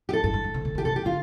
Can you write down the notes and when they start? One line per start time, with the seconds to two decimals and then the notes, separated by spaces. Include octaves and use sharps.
0.09 G4
0.13 A4
0.24 G2 A4
0.34 G2
0.44 G2
0.54 C3
0.65 C3
0.75 D3
0.78 G4
0.85 C3 A4
0.96 G4
1.05 D3 F4